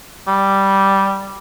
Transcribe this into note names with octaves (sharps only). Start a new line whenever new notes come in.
G3